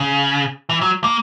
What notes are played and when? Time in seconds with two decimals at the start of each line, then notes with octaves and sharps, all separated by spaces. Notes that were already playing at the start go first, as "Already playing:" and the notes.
Already playing: C#3
0.69 E3
0.81 F#3
1.04 A#3